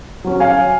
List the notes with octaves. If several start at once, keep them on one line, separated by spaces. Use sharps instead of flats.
F#3 C#4
F5 G#5